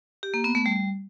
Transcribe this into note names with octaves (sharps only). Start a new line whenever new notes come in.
G4
A#3
B3
A3
G3